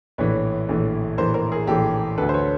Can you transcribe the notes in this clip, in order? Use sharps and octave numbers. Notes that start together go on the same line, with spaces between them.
A#1 A2 E3 B4 C#5
A#1 A2 E3
A#1 A2 E3 A#4 C5
A#4 C5
G#4 A#4
A#1 A2 E3 G4 A4
D2 D3 A4 B4
C5
B4 C#5